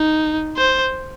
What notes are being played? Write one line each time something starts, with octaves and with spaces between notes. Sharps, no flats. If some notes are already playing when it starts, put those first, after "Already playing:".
Already playing: D#4
C5